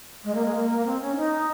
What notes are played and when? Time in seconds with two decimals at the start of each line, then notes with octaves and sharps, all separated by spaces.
0.24 G#3
0.35 A#3
0.45 G#3
0.55 A#3
0.71 A#3
0.86 C4
1.01 C#4
1.16 D#4